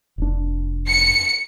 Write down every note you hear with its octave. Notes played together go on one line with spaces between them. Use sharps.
F1 D4
C#7